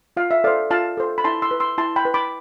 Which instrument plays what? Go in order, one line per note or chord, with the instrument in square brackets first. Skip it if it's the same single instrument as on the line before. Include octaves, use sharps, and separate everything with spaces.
[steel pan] F4 F5
E5
A4 C5 D5 F5
F4 F5 A5
A4 C5
B5
E4 A5 C6
C6 E6
B4
C6 E6
E4 A5 C6
G5 B5
B4
B5 D6